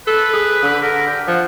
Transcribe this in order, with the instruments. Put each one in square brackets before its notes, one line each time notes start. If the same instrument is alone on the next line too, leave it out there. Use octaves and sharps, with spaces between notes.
[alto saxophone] A4 [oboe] B4
[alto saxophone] G#4
D3
[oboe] A#4
G4
[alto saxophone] F3 [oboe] F#5